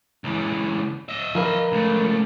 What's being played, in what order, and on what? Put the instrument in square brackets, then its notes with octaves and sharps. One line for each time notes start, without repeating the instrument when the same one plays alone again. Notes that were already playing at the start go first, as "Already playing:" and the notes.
[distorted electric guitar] C#2 E3
D#5 E5
[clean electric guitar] F3 A#4 B4
[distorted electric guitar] C#2 A3